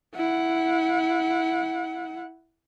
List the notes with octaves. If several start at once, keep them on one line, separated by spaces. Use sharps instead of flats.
E4 F#5